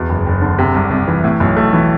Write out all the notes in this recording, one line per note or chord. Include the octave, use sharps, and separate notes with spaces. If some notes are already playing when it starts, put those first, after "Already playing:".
Already playing: E2 B2
F#1
F#1
D3
C3
C2
C2
E3
A2
B1
A3
E3